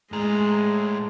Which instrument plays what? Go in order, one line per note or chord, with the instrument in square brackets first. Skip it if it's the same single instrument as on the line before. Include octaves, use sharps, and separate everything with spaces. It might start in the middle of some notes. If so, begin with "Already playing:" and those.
[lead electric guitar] A2 A#5 [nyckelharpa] G#3